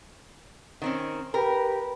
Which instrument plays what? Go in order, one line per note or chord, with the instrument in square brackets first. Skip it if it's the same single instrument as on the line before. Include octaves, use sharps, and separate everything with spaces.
[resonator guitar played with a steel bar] D#3 C4 C#4
[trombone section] G4 B4 [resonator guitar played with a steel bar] A#4